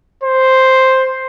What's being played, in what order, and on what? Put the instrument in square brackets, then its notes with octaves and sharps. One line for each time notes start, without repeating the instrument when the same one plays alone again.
[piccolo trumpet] C5